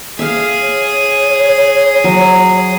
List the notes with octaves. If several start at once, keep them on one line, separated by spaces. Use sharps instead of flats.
G#4 E5 F5
C#5
F#3